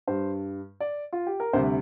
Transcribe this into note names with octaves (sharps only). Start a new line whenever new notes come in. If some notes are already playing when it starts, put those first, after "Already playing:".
G2 G3 C5
D5
F4
G4
A#4
D2 C3 G3 C5